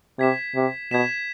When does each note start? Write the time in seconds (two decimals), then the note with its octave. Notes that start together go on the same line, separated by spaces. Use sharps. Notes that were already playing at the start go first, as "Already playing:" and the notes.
0.19 C3 G#6 B6 E7
0.55 C3
0.91 B2 G#6 B6 E7